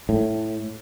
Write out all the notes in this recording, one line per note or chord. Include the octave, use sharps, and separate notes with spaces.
A2